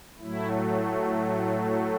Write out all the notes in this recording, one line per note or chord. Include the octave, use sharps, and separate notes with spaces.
A2 F#3 A3 E4